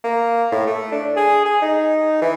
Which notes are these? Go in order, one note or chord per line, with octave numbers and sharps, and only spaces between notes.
A#3
A2
A3
D4
G#4
G#4
D#4
E3